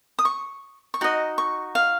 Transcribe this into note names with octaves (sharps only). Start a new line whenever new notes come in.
D#6
C#6
C#6
D#4 F#4 D#5
C#6
F5